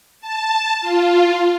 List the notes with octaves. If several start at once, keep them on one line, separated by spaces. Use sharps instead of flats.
A5
F4